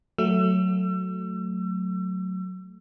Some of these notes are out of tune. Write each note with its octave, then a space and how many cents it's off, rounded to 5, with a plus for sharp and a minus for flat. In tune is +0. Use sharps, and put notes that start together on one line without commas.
F#3 +0 A3 +0 E6 +35